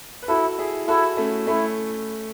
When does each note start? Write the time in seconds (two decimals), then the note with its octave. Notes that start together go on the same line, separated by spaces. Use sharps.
0.23 B4
0.28 E4 F#4 A4
0.59 E4 G#4
0.88 E4 F#4 A4
1.17 A3 C#4
1.47 A3 C#4 E4